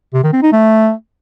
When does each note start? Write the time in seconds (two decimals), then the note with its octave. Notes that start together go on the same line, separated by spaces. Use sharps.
0.14 C3
0.23 D#3
0.33 C4
0.43 D#4
0.52 A3